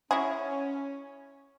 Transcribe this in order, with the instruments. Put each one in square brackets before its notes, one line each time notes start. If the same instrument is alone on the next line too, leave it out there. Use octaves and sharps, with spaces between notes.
[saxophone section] C#4 [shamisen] E4 F#4 G#4